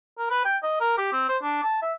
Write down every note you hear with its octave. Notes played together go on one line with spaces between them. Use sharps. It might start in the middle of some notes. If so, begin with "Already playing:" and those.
A#4
B4
G5
D#5
A#4
G4
C4
C5
D4
A5
E5